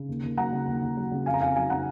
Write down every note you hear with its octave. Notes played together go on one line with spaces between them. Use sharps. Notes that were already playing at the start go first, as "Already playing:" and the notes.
Already playing: C#3
D#2
D#2
F#3 F#5 A#5
C#3
D#2
D#2
F#3
C#3
F2 F5 G#5
A#5
F2 F5 G#5
F#3 F5 G#5
C#3 F#5 A#5